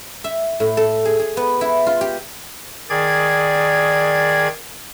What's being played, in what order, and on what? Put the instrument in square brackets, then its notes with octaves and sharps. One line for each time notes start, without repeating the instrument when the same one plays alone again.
[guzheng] E5
A2
A4
G#4
G#4
B3
E4
F4
G4
[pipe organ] D#3 G#4 D5 G#6